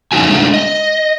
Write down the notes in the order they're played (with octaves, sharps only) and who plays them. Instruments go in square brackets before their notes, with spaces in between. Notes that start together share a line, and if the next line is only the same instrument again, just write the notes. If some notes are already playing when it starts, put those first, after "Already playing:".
[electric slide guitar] F2 C#3 D#4 F#4 G#5
G#3 A3 D4
D#5